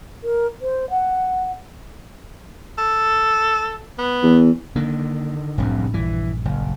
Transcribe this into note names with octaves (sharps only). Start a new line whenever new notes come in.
A#4
C5
F#5
A4
B3
E2
D3 D#3 A#3 D4
F1 C2 F#2 A2 D4
A#1 G2 E3
F#1